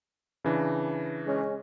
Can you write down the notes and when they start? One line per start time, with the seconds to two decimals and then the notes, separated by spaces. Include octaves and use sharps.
0.44 C#3 E3 D4
1.26 G#3 C#4